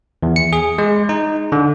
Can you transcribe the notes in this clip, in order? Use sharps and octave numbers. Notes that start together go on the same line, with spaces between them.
E2
C#7
G#4
G#3
D#4
D3